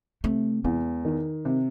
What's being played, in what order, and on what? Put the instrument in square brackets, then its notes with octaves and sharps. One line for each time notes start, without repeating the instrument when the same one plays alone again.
[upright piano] C3 [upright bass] A3
[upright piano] E2 [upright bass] G#3
[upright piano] D#3
C3